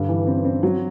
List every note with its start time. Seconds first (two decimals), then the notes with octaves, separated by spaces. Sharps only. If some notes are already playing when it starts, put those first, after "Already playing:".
Already playing: G2 D3
0.09 E3
0.27 C4
0.45 C4
0.63 F#3